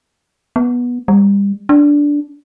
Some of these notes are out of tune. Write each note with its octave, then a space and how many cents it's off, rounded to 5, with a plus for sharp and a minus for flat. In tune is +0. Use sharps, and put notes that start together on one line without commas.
B3 -15
G3 +30
D4 -10